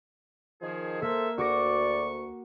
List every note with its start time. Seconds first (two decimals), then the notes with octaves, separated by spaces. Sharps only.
0.62 D#3 F3 G#4
1.02 A#3 A4 C5 E5
1.38 D2 F#4 D5 C#6 D6 A#6